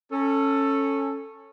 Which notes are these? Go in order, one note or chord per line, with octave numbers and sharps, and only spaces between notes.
C#4 A4